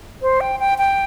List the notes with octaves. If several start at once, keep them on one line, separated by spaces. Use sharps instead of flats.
C5
G5
G5
G5